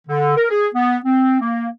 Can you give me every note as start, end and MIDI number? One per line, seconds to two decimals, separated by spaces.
0.07 0.36 50
0.37 0.47 70
0.50 0.68 68
0.75 0.98 59
1.04 1.38 60
1.41 1.70 58